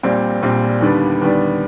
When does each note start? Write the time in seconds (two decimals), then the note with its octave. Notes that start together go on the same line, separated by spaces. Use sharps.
0.03 A#1 A#2 G3 C4
0.42 A#1 A#2 G3 C4
0.81 D#2 D3 G3 B3 D4
1.21 D#2 D3 G3 B3 D4